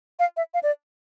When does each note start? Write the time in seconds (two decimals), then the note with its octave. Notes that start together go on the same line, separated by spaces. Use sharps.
0.19 F5
0.37 E5
0.54 F5
0.63 D5